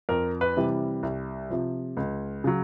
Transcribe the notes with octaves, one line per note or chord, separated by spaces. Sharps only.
F2 A#4
B4
C3 E3 G3
C2
C3 F3
C#2
C#3 F#3